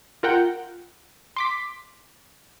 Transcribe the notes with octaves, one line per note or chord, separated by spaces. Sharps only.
F4 A#4 F#5 G5
C6 D6 B6